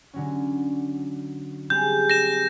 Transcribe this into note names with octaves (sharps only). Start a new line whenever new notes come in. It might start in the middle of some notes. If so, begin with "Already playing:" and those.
D3 F#3 C#4
G3 C4 G#4 G6
A#6 E7